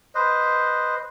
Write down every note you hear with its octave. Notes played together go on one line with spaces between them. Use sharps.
B4 C5 D#5